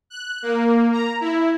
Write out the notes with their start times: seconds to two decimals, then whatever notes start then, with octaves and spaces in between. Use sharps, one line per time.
0.10 F#6
0.42 A#3
0.92 A#5
1.21 E4